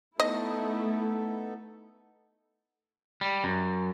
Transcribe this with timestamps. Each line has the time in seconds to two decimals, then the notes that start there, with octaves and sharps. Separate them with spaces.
0.20 A3 B3 D#4 E4 A4 D#5
3.21 G3
3.44 F#2